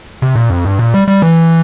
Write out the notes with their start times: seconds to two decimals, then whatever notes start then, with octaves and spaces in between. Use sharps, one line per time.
0.22 C3
0.35 A#2
0.50 F2
0.65 G2
0.79 A#2
0.94 G3
1.08 G3
1.22 E3